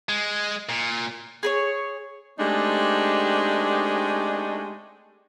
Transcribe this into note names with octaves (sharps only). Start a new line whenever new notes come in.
G#3
A#2
G#4 B4 C#5
G#3 A3 C4 D4 D#4 G4